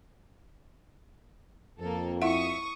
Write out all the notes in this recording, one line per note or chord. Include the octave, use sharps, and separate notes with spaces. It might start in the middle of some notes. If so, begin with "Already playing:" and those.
F2 A#3 A4
E4 E5 F#5 C#6 D#6